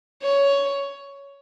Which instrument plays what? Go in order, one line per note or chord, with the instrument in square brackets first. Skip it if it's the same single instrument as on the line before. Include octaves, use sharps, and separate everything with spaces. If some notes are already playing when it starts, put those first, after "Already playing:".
[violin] C#5